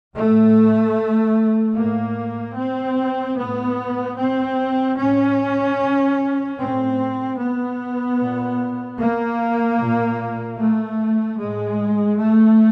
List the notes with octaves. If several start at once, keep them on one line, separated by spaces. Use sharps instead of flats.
A2 A3
A2 A#3
C4
A2 B3
C4
A2 C#4
A2 C4
B3
A#2
A#3
A#2
A3
A2 G#3
A3